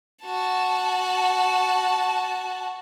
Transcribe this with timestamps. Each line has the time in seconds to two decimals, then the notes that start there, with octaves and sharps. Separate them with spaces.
0.24 F#4 A5